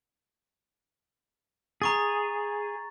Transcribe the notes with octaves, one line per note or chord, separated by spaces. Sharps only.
G#4 A#5 C#6 A6